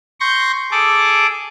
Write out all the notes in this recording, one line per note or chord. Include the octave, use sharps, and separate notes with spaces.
C6 C#6 G6 A#6
G#4 A4 D6